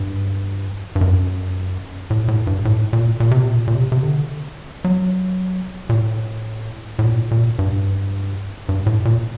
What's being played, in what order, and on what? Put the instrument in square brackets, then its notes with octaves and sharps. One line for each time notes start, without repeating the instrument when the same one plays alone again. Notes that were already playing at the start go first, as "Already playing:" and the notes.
Already playing: [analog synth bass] G2
G2
F#2
A2
A#2
A2
G2
A2
A#2
A#2
C3
A#2
A#2
C3
C3
D3
F#3
A#2
A2
A2
A#2
A#2
G2
G2
A2
A#2